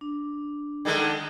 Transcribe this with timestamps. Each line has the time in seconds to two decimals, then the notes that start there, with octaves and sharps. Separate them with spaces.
0.01 D4
0.85 D3 D#3 G#3